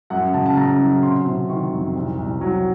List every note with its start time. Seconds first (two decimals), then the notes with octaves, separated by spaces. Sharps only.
0.10 F#2 F#5
0.34 C#3 A5
0.46 A5
0.57 C#3 A#5
0.79 F#3
1.03 C3 C6
1.26 C3
1.49 D#3 C#6
1.72 F2
1.95 C2
2.19 C2
2.41 F#3